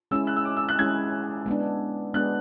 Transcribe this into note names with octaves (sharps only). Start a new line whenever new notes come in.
G#3 C#4 E4 G#4 E6
F#6
E6
D6
E6
F#6
G#3 C#4 E4 G#4 G#6
G#3 B3 D4
G#3 B3 D4 F#6